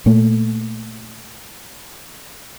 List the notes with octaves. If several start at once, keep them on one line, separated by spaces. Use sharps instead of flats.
A#2 A3